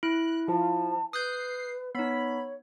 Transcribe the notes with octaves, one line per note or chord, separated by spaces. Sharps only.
E4 F#6
F3 A5
B4 D#6 F#6 G6 C7
B3 D#4 C#5 B5